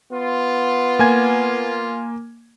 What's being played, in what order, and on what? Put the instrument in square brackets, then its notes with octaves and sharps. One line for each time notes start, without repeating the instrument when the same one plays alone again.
[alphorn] B3 [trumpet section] F4
[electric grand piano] A#3 G#5 G#6